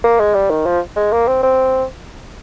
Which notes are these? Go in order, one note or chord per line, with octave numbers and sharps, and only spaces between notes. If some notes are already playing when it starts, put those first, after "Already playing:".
A#3
G#3
G3
D#3
F3
G#3
A#3
C4
C4